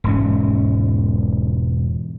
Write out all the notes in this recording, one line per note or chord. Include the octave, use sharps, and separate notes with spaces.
E1 G#2 C#4